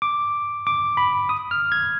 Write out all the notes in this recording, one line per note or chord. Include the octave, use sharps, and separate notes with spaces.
D6
D6
B5
D#6
F6
G#6